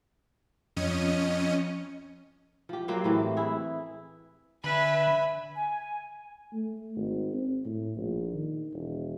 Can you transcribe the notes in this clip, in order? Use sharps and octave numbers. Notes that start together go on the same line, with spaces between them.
F2 C#4 D#5 C#7 D#7
F3 G4
F#3 A#3 C4 G4
A2 E3
E4 G#4
D3 B4 E5 G#5 B5
G#5
A3
G#1
C4
A2
A#1
D#3
E1